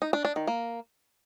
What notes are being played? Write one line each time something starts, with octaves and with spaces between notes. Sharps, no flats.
D#4
D4
D4
D#3
A#3